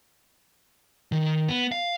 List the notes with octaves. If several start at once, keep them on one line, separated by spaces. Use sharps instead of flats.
D#3
B3
F5